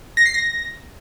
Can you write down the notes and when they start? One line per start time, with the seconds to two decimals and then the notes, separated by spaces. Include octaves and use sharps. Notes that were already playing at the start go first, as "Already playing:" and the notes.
0.17 A#6
0.26 C7
0.34 A#6